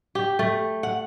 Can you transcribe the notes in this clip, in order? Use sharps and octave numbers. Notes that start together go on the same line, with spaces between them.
G4
A3
F#5